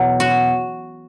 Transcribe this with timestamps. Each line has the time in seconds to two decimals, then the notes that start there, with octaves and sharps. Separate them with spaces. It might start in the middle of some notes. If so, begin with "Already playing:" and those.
Already playing: E2 B2 F#3
0.20 F#4